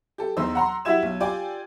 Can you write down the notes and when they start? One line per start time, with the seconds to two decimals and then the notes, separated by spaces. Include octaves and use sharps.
0.18 G4 A4
0.37 E2 D#4 C5 E6
0.55 F#5 A#5 C6
0.85 E4 F#4 G4 E5 G#6 E7
1.03 B1
1.20 F4 G4 D5 G5 G#5 D6